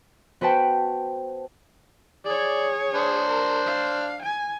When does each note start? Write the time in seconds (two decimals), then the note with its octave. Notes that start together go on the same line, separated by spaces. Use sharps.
0.41 B3 F#4 B4 C5 G5 A5
2.25 G#4 C#5 D5
2.95 D4 C5
3.28 A#4
3.67 F5
4.22 G#5